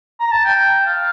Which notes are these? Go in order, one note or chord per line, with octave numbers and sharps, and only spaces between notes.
A#5
A5
G5
F5